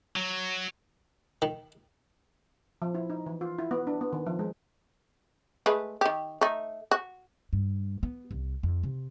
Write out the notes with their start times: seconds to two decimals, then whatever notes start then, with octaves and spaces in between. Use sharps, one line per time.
0.16 F#3
1.42 D#3
2.82 F3
2.94 E4
3.10 D#4
3.26 E3
3.41 F4
3.59 E4
3.71 B3
3.87 D4
4.01 B3
4.13 D#3
4.26 F3
4.39 G#3
5.66 G#3 A3 B4
6.01 D#3 G4
6.41 A3 D#4
6.91 F#4
7.53 G2
8.03 B3
8.31 C2
8.63 F2
8.83 C3